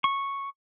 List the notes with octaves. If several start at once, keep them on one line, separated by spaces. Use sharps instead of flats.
C#6